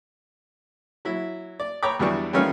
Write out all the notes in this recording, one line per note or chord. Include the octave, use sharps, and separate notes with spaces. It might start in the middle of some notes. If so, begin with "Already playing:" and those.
F#3 E4
D5
C#5 G5 A#5 B5 D6
E2 E3 F#3 G3 D4 C#6
D#3 E3 G3 A3 C#4 F4